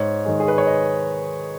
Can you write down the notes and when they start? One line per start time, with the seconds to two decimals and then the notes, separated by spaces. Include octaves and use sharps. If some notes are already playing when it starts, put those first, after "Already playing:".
Already playing: G#2 C#5
0.25 D#3 G#3
0.40 G#4
0.48 B4
0.58 C#5
0.67 D#5